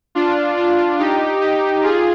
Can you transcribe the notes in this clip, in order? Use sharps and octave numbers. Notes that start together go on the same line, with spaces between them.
D4 F4
D4 F4
D#4 G4
D#4 G4
F4 G#4